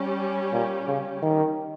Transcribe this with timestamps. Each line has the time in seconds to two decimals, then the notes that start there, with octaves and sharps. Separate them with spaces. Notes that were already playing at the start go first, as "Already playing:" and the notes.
Already playing: G3 C#4 G4
0.53 A#2
0.87 C#3
1.22 D#3